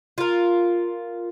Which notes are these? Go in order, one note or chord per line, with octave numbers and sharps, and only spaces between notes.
F4 A#4